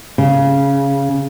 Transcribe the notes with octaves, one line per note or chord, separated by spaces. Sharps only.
C#3